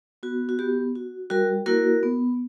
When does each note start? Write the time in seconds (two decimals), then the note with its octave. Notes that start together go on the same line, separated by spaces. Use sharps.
0.23 B3 F#4
0.49 F#4
0.59 B3 G4
0.95 F#4
1.30 G3 F#4 A#4
1.66 A#3 E4 F#4 A#4
2.03 B3